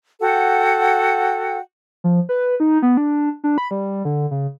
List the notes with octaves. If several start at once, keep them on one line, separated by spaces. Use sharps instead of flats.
F#4 A4 F#5 G5
F3
B4
D#4
B3
D4
D4
B5
G3
D3
C#3